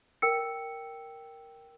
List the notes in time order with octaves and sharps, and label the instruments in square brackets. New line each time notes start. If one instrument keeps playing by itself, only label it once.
[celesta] A#4 G5 E6 C#7